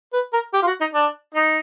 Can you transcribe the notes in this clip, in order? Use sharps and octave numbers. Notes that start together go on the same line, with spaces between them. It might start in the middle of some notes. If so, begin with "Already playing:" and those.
B4
A#4
G4
F4
F#4
D#4
D4
D#4